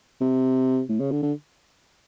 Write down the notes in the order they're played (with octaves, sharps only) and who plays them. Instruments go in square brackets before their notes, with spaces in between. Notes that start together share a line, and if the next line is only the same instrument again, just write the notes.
[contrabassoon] C3
A2
C#3
D3
D3